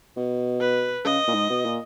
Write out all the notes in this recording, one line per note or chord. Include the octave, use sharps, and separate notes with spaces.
B2
B4
C#3 D#5
A#2
G#2
B2
A#2